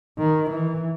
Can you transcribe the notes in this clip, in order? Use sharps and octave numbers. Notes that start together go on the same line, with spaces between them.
D#3
E3